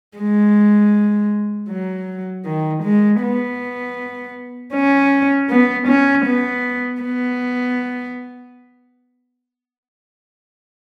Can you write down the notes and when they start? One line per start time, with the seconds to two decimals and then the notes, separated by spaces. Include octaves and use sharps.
0.17 G#3
1.69 F#3
2.45 D#3
2.83 G#3
3.22 B3
4.74 C#4
5.50 B3
5.88 C#4
6.26 B3
7.01 B3